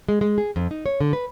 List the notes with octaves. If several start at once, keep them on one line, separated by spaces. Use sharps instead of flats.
G#3
G#3
G#4
F2
D#4
C#5
D3
B4